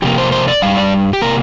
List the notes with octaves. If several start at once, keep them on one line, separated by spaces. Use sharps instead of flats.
F2 C3 A#3 G4
C5
C5
D5
G2 G3 F5
D5
G4
C3 A#3 A#4